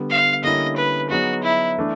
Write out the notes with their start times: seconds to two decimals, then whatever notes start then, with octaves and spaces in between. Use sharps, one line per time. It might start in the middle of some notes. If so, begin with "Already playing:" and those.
Already playing: D3 G3 B3
0.10 F5
0.44 D3 G3 A#3 C#4 E4 D#5
0.77 B4
1.10 F#3 B3 D#4 F#4 G#4
1.43 E4
1.77 E3 A3 D4